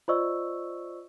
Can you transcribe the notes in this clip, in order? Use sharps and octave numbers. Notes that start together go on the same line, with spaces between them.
F4 C5 D5 D#5 C#6 E6